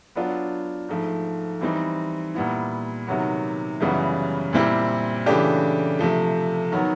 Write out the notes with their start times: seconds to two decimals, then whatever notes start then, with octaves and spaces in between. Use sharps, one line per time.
0.16 F#3 B3 D4 F4
0.89 G#2 F3 A3
1.61 E3 G3 C4 D#4
2.34 A#2 G3 B3 E4
3.07 C3 D#3 F#3 B3
3.80 F#2 C#3 E3 G3 B3
4.53 A#2 G3 C4 E4 G4
5.26 C#3 E3 A3 D4 G4
5.99 C3 F3 A3
6.72 D#3 F#3 B3